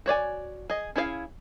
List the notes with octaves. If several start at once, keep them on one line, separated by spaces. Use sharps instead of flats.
F#4 C#5 D5 G#5
G#4 D#5
C#4 E4 G#4 D5 F5